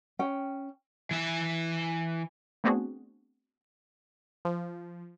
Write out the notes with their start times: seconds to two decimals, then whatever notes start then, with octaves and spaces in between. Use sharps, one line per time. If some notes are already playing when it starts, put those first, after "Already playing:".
0.19 C#4 G5
1.11 E3 E5
2.64 A3 B3 C4 D4 F#4 G#4
4.45 F3